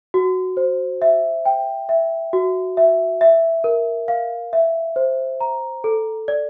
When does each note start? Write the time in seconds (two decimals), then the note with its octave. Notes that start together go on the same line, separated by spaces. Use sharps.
0.14 F#4
0.57 C5
1.02 E5
1.45 G5
1.89 E5
2.33 F#4
2.77 E5
3.21 E5
3.64 A#4
4.08 F5
4.53 E5
4.96 C5
5.41 A#5
5.84 A4
6.28 D5